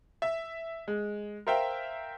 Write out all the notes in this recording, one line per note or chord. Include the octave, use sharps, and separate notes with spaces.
E5
G#3
A#4 C5 E5 F5 G5